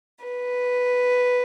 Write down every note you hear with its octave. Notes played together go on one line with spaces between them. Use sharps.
B4